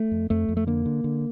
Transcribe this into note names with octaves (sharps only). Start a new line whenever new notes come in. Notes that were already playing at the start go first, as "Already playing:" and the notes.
Already playing: A3
F2
F2 A3
F2
A3
D3 A#3
D3
D3